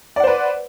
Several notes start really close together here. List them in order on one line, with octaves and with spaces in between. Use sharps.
D5 F#5 C5 B4